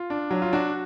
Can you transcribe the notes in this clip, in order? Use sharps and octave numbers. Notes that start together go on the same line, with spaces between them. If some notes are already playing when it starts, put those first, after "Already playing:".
Already playing: F4
D4
F#3
F4
D4 F#4